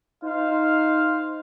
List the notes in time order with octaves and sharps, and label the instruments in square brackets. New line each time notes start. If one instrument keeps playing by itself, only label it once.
[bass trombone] D#4 [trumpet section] F4 C5 F5